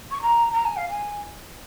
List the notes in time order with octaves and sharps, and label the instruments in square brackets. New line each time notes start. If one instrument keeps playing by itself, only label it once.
[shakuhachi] C#6
A#5
A#5
G#5
F5
G#5